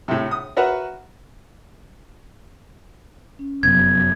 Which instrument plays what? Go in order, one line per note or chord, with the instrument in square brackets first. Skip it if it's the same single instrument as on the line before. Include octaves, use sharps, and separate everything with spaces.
[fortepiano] A2 C3
D#6
F#4 A#4 B4 E5 F#5 A#5
[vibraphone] C#4
[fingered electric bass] F1 F#2 [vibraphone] B3 [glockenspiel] G#6